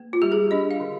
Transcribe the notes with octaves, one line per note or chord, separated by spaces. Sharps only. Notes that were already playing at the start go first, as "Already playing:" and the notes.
Already playing: A#3
F4
G3 G4
G#4
D4 D#5
F5
D3